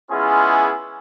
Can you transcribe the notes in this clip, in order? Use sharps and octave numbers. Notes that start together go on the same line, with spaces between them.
G#3 B3 C#4 E4 F4 G#4